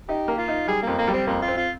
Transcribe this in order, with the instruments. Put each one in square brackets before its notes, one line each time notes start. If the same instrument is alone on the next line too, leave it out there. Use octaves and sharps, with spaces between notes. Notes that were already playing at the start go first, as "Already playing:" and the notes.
[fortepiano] D#4 [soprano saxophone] G4
[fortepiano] A#3
[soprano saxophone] F4
[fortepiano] D#4
[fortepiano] G3 [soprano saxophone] G#4
[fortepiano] F2 [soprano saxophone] A#3
[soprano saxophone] A#3
[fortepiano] G3
[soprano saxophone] C4
[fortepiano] F2 [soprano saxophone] A#3
[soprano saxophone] F4
[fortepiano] C4
[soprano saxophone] F4